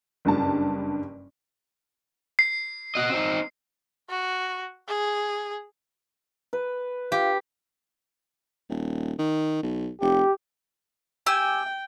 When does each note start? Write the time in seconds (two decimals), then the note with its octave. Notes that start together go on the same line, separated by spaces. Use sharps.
0.25 F#1 G2 A5
2.39 C7
2.95 F#4 D#5
3.10 C4 D#4
4.09 F#4
4.89 G#4
6.53 B4
7.12 F4 G4
8.70 D#1
9.19 D#3
9.63 B1
10.01 F1 G4
11.26 G4 G5 G#5 E6